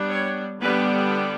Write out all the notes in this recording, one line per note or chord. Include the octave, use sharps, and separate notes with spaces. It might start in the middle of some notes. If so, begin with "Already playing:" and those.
Already playing: G3 B3 D4
C#5
D3 G3 B3 D4 B4